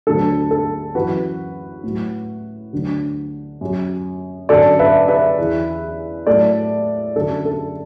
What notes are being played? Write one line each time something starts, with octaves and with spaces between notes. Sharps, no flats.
D2 D3 F#3 A4
A4
F#2 E3 F#4 B4
A2 F#3
D2 D3 F#3
F#2 F#3
F#2 D3 F#3 A4 D5
B4 E5
B4 E5
E2 E3
A2 F#3 A4 D5
F#2 D3 F#3 A4
A4